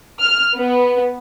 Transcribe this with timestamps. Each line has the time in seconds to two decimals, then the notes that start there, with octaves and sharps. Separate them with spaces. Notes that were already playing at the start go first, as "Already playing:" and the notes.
0.20 F6
0.56 B3